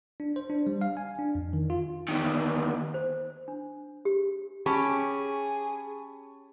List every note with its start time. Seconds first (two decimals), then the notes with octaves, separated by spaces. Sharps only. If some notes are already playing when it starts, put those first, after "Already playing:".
0.20 D4
0.36 C5
0.50 D4
0.67 G3
0.81 F5
0.97 G#5
1.19 D4
1.35 F2
1.53 D#3
1.70 F4
2.09 E2 D#3
2.94 C5
3.48 D4
4.05 G4
4.66 C#4 G4 G#4 A5 B5 C#6